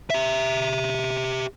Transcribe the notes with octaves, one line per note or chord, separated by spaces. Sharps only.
G4 E5